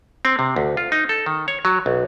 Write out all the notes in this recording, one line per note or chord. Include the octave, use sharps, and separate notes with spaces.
C4
C3
D2
F4
D#4
A4
D#3
C#5
F#3
B1